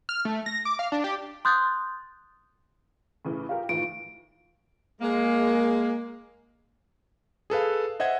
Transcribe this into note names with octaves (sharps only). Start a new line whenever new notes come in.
F6
A3
A#6
D6
F5
D4
G4
C6 D#6 F#6 G6 A6
A2 C#3 E3
F4 G4 A#4 F5
G#1 A2 E3 F4 D7
G#3 A#3
G#4 A4 B4 F5
C5 D#5 E5 F#5 G#6